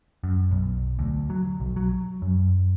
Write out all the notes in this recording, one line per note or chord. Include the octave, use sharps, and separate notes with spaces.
F#2
B1
D2
F#3
B1
F#3
F#2